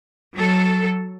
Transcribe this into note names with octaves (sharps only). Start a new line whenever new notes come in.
F#3 A4